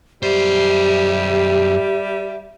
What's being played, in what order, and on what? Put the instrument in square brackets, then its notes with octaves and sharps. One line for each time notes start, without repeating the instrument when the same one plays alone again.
[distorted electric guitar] F#2 C5 [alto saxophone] G3 [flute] G4 [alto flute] E5